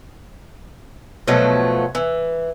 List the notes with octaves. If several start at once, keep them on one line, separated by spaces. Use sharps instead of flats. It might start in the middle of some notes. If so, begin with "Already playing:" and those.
B2 F3 F#3 A3
E3